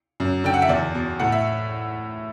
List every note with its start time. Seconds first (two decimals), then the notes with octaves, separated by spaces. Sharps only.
0.20 F#2
0.44 D3 G5
0.54 F#5
0.62 E5
0.69 E2 D5
0.94 B2
1.19 A2 F#5
1.32 E5